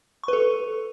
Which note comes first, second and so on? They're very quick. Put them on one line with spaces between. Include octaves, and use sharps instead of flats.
C#6 B4 A4